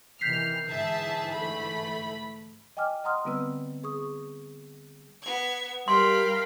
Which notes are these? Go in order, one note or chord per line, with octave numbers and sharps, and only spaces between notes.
C3 D#3 E3 F6 G6 B6 C7
G#2 D3 E3 G#4 E5 A5
A3 B5
D#5 G5 G#5 D6 F6
D#5 F#5 A#5 C6 D#6 F6
D3 G3 B3 C4 B4 E6
G#4 C#6 D#6
B3 G#6
G3 A#4 F5 G5 B5 C6